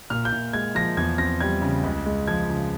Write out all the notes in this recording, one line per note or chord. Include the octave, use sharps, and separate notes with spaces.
A#2 F6
G6
A#2
G#3 G#6
F3 A#6
E2 G#6
C4 A#6
G3 G#6
C#3
C#2
G#3
F3 G#6
C#3